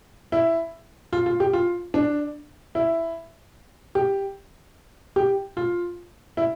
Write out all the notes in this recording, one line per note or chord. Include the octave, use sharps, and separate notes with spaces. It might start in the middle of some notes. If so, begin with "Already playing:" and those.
E4
F4
F4
G4
F4
D4
E4
G4
G4
F4
E4